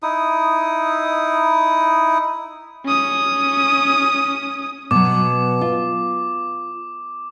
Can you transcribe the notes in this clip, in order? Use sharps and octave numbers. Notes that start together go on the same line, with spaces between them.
D#4 E4 D#6
C#4 D#6
B2 F#3 D6
F4